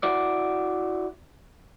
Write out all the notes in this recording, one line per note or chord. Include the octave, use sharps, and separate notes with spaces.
E4 F#4 D5